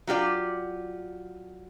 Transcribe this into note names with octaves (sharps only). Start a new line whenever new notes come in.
F#3 F4 G4 D5